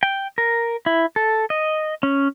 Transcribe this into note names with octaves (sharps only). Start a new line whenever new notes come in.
G5
A#4
E4
A4
D#5
C#4